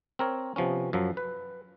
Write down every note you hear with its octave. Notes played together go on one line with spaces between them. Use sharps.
C4 A#4 C#5
C3 F3 B3 C#4
F#2 F3 F#3
B4